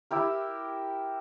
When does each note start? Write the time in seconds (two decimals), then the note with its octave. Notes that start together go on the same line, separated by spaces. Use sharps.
0.11 E4 G4 A#4